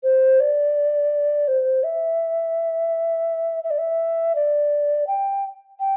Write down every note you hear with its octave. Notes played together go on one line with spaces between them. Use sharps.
C5
D5
C5
E5
E5
D5
E5
D5
G5
G5